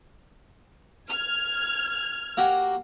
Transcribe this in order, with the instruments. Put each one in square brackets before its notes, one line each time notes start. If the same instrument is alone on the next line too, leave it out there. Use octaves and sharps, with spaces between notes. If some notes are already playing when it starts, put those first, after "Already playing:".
[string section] F6 G#6
[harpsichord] A#3 F#4 G4